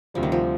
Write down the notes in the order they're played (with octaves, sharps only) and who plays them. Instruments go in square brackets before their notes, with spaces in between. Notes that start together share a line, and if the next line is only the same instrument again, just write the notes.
[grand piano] D2 C3 G3 [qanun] F3
[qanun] D#3
F3